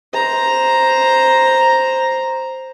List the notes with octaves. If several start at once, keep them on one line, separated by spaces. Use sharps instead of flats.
C5 A#5